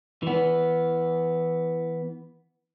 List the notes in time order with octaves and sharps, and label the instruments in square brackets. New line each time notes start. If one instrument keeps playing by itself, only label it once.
[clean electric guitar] E3 B3